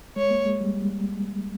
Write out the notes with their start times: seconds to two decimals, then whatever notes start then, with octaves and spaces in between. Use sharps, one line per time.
0.16 G#3 C#5
0.31 A#3
0.46 G#3
0.61 G3
0.75 G3
0.90 G3